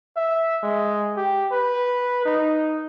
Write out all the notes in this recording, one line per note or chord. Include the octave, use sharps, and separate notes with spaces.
E5
G#3
G4
B4
D#4